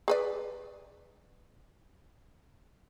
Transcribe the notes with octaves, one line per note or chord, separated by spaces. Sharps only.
G#4 B4 D5